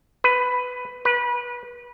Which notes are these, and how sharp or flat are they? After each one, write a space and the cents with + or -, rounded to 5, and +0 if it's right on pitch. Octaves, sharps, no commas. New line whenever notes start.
B4 +10
B4 -25